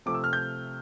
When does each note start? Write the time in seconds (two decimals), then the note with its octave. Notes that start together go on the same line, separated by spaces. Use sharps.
0.06 C3 F3 A3 D6
0.14 E6
0.24 F6
0.33 G6